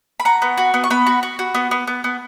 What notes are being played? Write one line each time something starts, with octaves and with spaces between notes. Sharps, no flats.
B5
F#4 A#5
B3
F#4
B3
C#6
B3 B5
F#4
F#4
F#4
B3
B3
B3
B3